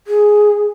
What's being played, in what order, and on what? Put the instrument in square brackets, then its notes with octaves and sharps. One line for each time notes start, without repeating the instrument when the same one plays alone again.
[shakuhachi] G#4